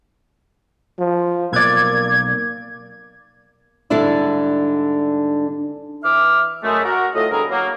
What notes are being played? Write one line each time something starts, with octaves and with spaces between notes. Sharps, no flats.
F3
B1 A#3 D5 G#6
G#2 D3 G3 D4 E4 D5
E3 E5 D6 F6
F#2 G#3 A3
F#4 A#4
A2 F4 D#5
B2 D3 G3 E4 G#4 A#4
F#3 A#3